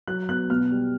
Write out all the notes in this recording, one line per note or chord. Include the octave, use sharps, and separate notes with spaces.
F#3 F#6
B3 F#6
B2 F6
G3